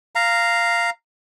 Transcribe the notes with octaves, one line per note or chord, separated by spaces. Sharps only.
F5 A#5